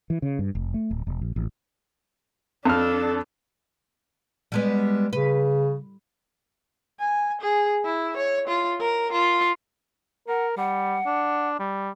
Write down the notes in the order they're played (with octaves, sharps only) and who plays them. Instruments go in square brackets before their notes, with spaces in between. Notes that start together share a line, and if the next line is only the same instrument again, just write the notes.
[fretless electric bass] E3
C#3
G2
F1
A3
D1
E1
A#1
A1
[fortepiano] F2 F6 [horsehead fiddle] D4 A4
[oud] G3 G#3 B3
[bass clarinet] C#3 [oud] B4
[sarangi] G#5
G#4
E4
C#5
F4
A#4
F4
[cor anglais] A#4 [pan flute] F#5
[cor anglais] G3 [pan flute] F#5
[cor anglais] D4
G3